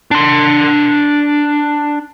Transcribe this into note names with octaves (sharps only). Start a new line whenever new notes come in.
D4 C6